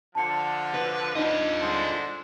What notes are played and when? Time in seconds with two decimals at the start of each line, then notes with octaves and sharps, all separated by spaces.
0.15 D3 F3 A5 C#7
0.74 B4
1.16 D4 D#4 F4 D#5
1.60 D3 G#3 C5